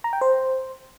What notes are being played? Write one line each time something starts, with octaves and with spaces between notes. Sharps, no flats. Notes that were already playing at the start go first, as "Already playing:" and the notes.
A#5
G5
C5